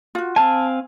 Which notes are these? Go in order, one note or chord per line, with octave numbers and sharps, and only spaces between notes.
F4 F#4
C4 F5 G#5 A5